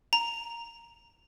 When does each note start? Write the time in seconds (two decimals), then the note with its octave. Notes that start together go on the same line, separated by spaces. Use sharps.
0.13 A#5